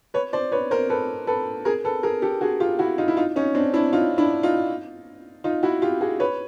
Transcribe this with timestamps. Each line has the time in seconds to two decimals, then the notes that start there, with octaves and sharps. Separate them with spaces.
0.14 B4 C#5
0.33 C5 D5
0.52 B4 C#5
0.71 A#4 C5
0.90 A4 B4
1.27 A4 B4
1.65 G#4 A#4
1.84 A4 B4
2.03 G#4 A#4
2.22 G4 A4
2.41 F#4 G#4
2.60 F4 G4
2.79 E4 F#4
2.98 D#4 F4
3.08 E4
3.17 D#4 F4
3.36 C#4 D#4
3.55 C4 D4
3.74 D4 E4
3.93 D#4 F4
4.18 D4 E4
4.43 D#4 F4
5.44 D#4 F4
5.63 E4 F#4
5.82 F4 G4
6.01 F#4 G#4
6.20 B4 C#5